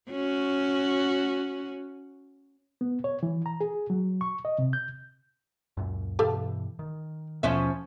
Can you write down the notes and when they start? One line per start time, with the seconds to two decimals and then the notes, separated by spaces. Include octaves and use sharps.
0.10 C#4 F#4
2.81 B3
3.04 C#5
3.23 E3
3.46 A#5
3.61 G#4
3.90 F#3
4.21 C#6
4.45 D#5
4.59 C3
4.73 G6
5.77 C#2 F#2 A#2
6.19 G2 B2 E3 G4 A4 F5
6.79 D#3
7.43 D#2 B2 F3 B3 C#4 E5